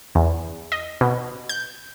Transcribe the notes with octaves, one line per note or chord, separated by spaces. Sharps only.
E2
D#5
B2
G6